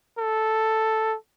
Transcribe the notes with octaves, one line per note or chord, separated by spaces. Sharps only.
A4